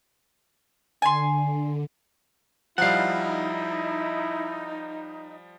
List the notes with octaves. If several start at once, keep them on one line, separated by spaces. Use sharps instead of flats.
D3 G#5 C6
F3 G3 D#4 E4 F5 F#5